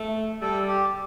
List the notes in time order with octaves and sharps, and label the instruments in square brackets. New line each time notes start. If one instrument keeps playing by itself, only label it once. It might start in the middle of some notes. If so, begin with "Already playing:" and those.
Already playing: [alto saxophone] A3
[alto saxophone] G3 [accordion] A4
[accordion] G4